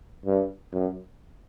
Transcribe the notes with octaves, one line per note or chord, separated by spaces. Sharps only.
G2
F#2